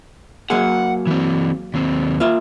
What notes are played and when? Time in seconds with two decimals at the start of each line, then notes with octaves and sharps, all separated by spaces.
0.50 F#3 A#3 G#4 F#5
1.07 E3 C4
1.74 D#2 C4
2.20 A#3 F4 E5